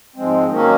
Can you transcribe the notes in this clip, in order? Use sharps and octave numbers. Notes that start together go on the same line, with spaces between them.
G#2 F3 G#3 C4
D#3 F#3 A#3 C#4